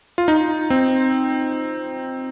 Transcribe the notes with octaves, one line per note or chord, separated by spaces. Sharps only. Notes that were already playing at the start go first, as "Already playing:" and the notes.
F4
D#4
C4